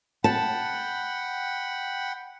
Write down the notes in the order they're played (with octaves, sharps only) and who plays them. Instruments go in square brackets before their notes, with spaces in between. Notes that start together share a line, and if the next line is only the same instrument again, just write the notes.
[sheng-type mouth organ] F#5 G5 B5 [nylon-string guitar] A5